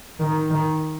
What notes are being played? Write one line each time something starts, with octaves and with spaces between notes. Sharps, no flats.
D#3
D#3